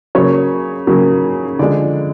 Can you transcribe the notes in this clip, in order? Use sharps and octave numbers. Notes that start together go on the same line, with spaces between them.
C#3 F#3 A#3 C#5
C#3 F#3 A#3
D3 F3 G#3 D5